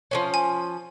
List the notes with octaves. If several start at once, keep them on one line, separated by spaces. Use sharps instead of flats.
F3 B3 C#4
G#5